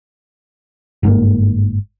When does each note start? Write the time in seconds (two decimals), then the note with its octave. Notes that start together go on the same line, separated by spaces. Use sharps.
1.03 G1 G#2 C3 A#3